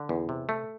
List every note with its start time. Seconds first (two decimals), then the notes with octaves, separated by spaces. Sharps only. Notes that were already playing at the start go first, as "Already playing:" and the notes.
Already playing: D3
0.09 E2
0.29 C3
0.49 A3